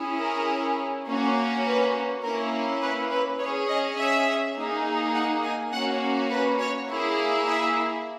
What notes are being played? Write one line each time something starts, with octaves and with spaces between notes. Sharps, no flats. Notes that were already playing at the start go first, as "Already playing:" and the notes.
Already playing: C#4 E4 G#4
A#4
A#3 C#4 F#4
B4
A#3 C#4 E4 A#4
B4
B4
C#4 G#4 C#5
D#5
E5
A#3 D#4 G#4
F#5
G#5
A#3 C#4 F#4 F#5
B4
C#5
A#3 E4 G#4
E5